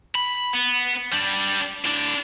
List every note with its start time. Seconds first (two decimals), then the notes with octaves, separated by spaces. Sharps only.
0.15 B5
0.53 B3
1.12 G3 D4
1.85 A2 D4